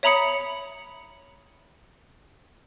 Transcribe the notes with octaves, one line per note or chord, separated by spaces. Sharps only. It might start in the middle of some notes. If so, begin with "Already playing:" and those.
C#5 E5 A#5 B5 D#6 C#7